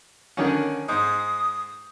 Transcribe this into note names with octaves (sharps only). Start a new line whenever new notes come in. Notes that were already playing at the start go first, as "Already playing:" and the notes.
D3 D#3 C#4
G#2 D#6